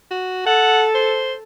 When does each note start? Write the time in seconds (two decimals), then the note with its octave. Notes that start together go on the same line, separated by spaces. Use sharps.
0.11 F#4
0.46 A4 F#5
0.95 C5